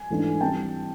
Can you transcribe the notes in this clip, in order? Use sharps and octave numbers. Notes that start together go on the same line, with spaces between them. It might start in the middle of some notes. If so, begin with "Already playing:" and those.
Already playing: G#5
G#2 E3 A3 D4
E3 G3 C4 G5 A5